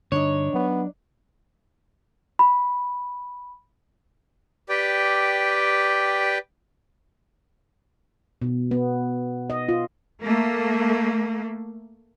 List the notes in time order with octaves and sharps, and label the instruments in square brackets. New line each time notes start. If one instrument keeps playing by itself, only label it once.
[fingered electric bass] G2 D3 [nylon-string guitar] D4 D#4 D#5 [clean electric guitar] C#5
[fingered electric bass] F#3 [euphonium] B3
[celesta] B5
[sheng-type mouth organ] G4 B4 D5 G5
[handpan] B2
B3
D#5
F4
[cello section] A3 A#3